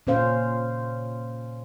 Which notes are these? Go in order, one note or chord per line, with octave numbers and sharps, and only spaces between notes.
A#2 C#4 C5 F5